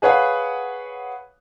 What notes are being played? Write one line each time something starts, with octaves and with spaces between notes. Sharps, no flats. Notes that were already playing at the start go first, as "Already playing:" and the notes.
G#4 B4 C#5 F5 F#5